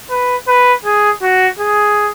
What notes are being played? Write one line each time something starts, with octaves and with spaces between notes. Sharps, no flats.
B4
B4
G#4
F#4
G#4